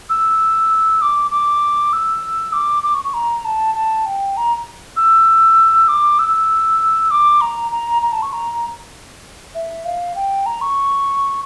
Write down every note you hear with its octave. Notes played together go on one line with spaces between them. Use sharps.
E6
D6
D6
E6
D6
D6
C#6
C#6
A#5
A5
A5
G5
A#5
E6
D6
E6
D6
A#5
A#5
A#5
A5
C#6
A#5
E5
F5
G5
A#5
C#6